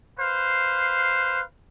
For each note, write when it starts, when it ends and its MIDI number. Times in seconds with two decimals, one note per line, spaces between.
0.19 1.42 71
0.19 1.42 72
0.19 1.42 77